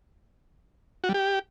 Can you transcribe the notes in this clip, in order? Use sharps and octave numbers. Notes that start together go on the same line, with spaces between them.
F#4
G3
G4